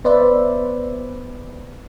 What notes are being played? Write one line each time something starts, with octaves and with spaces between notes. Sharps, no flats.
B3 B4 C5 D5 E5